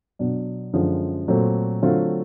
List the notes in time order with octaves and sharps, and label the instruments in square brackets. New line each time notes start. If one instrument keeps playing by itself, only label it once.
[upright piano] B2 F#3 B3 D4
F#2 D3 F3 G#3
A#2 F#3 A3 C4
D3 F#3 A3 C4 F4